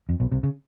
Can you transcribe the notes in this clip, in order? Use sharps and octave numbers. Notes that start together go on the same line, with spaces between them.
F2
B1 B2
C2 C3
C#3